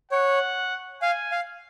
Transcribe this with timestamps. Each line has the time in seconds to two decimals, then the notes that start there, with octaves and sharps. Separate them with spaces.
0.11 C#5 F#5
1.02 F5 G#5
1.32 F5